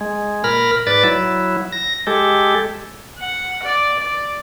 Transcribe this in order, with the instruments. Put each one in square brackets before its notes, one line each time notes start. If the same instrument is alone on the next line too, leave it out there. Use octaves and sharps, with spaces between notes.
[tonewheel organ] G#3
A#2 A#4 B5 F6
G#2 B4 D5 A6
F#3 E4
A#6
G#3 G4 A4
[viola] F#5
D5
D5